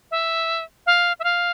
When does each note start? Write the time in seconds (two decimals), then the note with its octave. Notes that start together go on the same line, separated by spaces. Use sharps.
0.11 E5
0.86 F5
1.19 E5
1.24 F5